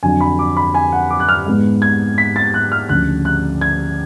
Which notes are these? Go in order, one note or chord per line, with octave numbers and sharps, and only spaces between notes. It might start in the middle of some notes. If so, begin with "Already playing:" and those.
F2 D3 F#3 G#5
B5
D6
B5
G#5
F#5
D6
F#6
F6
G#2 G#3 B3
G#6
B6
A6
F#6
F6
D2 C#3 F3 F#6
F#6
G#6